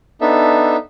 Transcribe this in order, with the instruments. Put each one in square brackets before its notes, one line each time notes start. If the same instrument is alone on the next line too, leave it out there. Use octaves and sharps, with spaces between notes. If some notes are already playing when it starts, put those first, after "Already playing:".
[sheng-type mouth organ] B3 D4 D#4 A4 E5